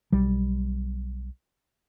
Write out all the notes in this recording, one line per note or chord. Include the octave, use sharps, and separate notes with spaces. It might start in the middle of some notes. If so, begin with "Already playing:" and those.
B1 G3